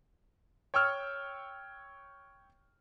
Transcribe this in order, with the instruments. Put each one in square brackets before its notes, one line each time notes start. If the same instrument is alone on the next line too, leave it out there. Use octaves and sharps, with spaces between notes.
[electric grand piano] C#5 G5 C#6 E6 F6